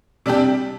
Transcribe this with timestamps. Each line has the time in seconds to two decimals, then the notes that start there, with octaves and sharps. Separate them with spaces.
0.26 C3 G3 D4 G4